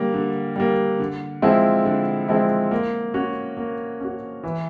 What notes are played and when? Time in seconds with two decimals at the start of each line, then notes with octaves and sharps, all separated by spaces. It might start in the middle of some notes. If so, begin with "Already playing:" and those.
Already playing: D3 G3 A#3
0.14 D3
0.56 G3 A#3
0.99 D3
1.42 F3 G#3 C4 E4
1.85 D3
2.28 F3 G#3 C4 E4
2.71 A#3
3.14 C#4 F#4
3.57 A#3
4.01 C#4 F#4
4.44 E3